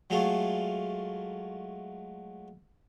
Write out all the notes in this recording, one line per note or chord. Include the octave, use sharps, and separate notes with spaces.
F#3 G#3 A3 F4